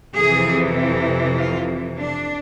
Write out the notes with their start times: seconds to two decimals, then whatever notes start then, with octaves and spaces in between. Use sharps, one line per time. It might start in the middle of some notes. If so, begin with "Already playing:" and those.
0.16 F2 C3 E3 G#4
1.38 F4
1.98 D4